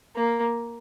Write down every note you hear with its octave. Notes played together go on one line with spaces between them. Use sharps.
A#3